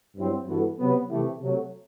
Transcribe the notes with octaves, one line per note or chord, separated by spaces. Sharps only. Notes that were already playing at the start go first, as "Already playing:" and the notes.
G2 F#3 C4 E4
G2 E3 B3 F#4 A4
C3 F#3 B3
C3 E3 A3 E4 G4
C3 F#3 A3